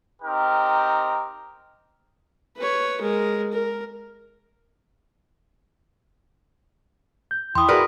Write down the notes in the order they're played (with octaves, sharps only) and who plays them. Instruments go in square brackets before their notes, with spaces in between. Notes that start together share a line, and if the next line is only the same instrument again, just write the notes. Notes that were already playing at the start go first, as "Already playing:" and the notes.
[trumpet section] C4 D#4 G4 A#4
[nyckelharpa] B4 C#5
G#3 A#4
A#4
[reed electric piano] G6
[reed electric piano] E2 [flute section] E4 G5 [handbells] C6 D#6
[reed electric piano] F#4 G#4 D5 [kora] A#4 B4